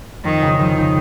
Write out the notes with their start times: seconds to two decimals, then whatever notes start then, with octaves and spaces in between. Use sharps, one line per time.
0.24 F2 D#3
0.42 C#3 G#3 D#4
0.59 F2 D#3
0.77 C#3 G#3 D#4